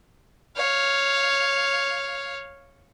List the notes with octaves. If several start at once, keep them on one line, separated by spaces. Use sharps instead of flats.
C#5 F5